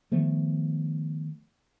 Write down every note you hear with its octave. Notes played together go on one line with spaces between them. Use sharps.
D#3 F3 A3 B3